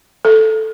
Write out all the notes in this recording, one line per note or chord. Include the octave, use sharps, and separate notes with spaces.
A4